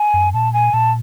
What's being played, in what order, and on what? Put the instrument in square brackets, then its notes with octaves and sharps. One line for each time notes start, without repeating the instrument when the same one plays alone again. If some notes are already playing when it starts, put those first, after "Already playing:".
Already playing: [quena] G#5
[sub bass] F#2
[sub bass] A#2 [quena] A5
[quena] G#5
[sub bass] A#2 [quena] A5